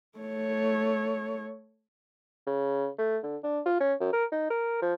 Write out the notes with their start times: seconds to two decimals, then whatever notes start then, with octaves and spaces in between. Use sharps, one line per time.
0.18 A3 C#5
2.47 C#3
2.98 A3
3.23 D3
3.44 D4
3.66 F4
3.80 C#4
4.00 F#2
4.13 A#4
4.32 D#4
4.50 A#4
4.82 F3